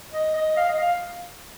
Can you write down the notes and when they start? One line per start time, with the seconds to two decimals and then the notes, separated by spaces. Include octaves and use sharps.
0.13 D#5
0.36 D#5
0.57 F5
0.68 D#5
0.79 F5